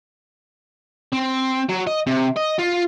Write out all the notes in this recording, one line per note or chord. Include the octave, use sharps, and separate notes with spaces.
C4
F#3
D#5
C3
D#5
F4